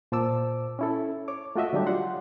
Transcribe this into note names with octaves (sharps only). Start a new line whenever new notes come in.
A#2 C5 A5 D6 E6
C#4 E4 A4
C#5 D6
A3 F4 F#4 D#5 E5
D3 F#3 G3 D4 G4
F4 F#5 C6